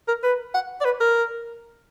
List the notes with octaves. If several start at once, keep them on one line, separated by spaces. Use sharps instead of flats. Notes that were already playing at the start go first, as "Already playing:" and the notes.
A#4
B4
F#5
D5
B4
A#4